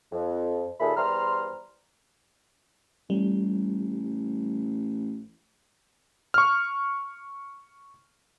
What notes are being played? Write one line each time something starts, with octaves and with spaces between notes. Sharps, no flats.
F2
D#2 A#2 G#4 A4 E5 B5
E2 G3 C5 A#5 C6 F6
A1 G3
C#6 F6